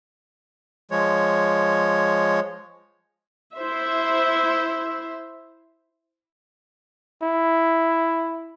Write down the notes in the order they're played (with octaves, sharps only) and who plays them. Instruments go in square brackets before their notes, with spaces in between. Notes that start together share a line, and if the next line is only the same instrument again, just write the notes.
[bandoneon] F3 G#3 C#5
[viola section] E4 C5 E5
[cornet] E4